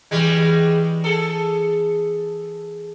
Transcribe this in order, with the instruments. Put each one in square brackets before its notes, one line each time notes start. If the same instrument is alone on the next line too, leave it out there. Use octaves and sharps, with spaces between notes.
[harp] E3 C#6 G#6 [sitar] G3 G#3
[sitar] G#4 A4 [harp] D7